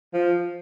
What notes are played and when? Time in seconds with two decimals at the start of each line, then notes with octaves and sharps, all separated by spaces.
0.14 F3